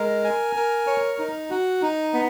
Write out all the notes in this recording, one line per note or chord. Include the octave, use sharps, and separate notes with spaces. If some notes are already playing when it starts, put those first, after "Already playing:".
Already playing: G#3 A#4
G#5
A#4
C#5
D#4
F#4
D#4
B3